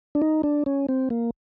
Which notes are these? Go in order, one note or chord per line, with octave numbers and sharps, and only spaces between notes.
D4
D#4
D4
C#4
C4
A#3